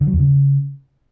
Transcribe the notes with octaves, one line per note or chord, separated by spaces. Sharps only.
D3
F#3
E2
C#3